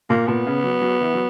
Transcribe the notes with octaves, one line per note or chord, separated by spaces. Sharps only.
A#2 A#3
A#2 B3
C#3
F#3
F#3
E3
F#3